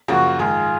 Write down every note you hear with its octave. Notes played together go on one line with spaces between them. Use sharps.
F#2 C#3 F3 A#3 F4 F#4
G#2 D#3 G#3 F4 G#4